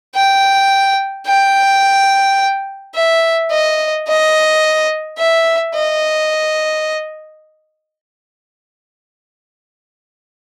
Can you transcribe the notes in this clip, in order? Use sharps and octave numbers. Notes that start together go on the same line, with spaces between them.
G5
G5
E5
D#5
D#5
E5
D#5